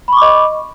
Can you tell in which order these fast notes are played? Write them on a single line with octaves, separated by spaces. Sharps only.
B5 C#6 D6 D#5